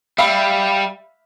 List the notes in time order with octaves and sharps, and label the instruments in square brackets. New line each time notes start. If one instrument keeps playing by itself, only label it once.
[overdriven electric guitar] G3 [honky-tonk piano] E5 F5 B5